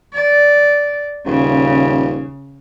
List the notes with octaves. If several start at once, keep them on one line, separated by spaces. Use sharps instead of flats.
D5
D#1 C#3